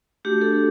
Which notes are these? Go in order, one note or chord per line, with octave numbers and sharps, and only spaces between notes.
A3 D4 F#4 G4
A4